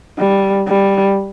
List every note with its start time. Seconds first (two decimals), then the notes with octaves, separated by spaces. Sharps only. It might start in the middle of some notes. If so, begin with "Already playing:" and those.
0.19 G3
0.68 G3